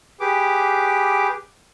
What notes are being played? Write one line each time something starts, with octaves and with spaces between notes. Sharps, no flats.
G4 G#4 B4 D6